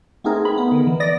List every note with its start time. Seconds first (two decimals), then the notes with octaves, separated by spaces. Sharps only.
0.24 A3 B3 C4 D#4 G#4 A#4
0.45 B5
0.58 B3
0.72 D3 D#3
0.87 E3
1.00 D5 D#6 A#6